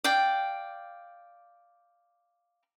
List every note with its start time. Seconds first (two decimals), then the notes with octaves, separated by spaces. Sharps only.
0.04 D5 F5 G5